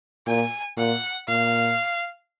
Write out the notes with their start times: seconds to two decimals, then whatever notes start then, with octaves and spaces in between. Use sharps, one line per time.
0.27 A#2 G#5
0.77 A#2 F#5
1.28 A#2 F5